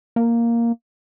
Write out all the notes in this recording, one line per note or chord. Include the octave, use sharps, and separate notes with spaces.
A#3